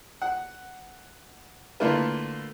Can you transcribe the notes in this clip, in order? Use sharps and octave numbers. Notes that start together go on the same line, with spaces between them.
F#5
D3 A3 A#3 E4 F4 B4